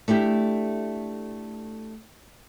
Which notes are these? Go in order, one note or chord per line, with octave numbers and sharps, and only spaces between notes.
A3 D4 E4 G4